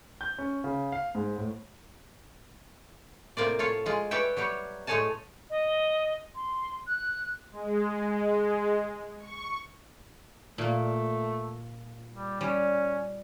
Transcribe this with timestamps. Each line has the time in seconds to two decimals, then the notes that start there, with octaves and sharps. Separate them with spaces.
0.21 G6
0.38 C#4
0.64 C#3
0.92 F5
1.15 G#2
1.38 A2
3.37 A2 C3 A#3 F4 D5
3.59 F4 A4 C#5
3.86 G#3 F4
4.11 B4 C#5 D5 E5 G5
4.37 F#3 G3 G4 C#5
4.87 A2 G#3 A3 C#5 G#5 A5
5.50 D#5
6.35 C6
6.87 F#6
7.51 G#3
9.19 C#6
10.58 A#2 A3 A#3
12.13 G3
12.41 G3 C#4